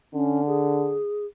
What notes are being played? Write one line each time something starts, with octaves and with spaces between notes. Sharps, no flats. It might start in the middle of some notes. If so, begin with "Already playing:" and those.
D3 C#4
G#4